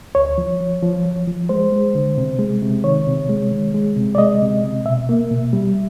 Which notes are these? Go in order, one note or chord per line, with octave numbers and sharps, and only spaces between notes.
D2 C#5
F3
F3
F3
F3
F3
G#3 C5
G#3
D3
C3
G#3
C3
D#3 C#5
C3
G#3
D#3
G#3
C3
D5
G#3 D#5
C3
C3
B2 E5
A#3
B2
G3